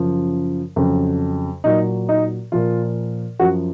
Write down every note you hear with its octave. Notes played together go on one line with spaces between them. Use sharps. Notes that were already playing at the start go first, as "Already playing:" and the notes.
Already playing: F#2 C#3 F3
F2 C#3 F#3
A#2 F#3 D#4
D#4
A#2 F3 F4
F#2 F3 F#4